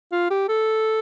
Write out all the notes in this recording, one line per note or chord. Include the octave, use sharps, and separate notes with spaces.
F4
G4
A4